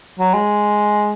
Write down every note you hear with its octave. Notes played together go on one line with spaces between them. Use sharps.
F#3
G#3